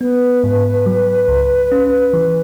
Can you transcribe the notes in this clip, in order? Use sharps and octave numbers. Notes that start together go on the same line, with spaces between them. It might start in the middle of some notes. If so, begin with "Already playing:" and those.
B3 B4
G#2
F#3
C#2
C#4
E3